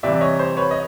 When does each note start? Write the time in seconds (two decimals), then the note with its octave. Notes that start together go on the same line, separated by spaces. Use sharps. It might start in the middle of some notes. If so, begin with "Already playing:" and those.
0.03 C3 E3 G3 D5 E5
0.21 C#5 D#5
0.39 C5
0.57 B4 C#5
0.71 D#5